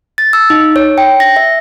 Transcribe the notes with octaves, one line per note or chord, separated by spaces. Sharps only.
A6
E6
D#4
C#5
G5
A#6
E5